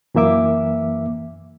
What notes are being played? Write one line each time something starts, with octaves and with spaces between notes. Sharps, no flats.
F#2 E3 A#3 E5 D6